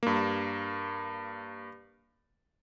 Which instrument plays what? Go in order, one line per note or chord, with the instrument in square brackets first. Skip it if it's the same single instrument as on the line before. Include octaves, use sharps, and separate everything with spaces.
[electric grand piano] G2 A#3